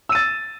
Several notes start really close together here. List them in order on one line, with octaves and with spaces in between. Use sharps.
E6 D#7 A6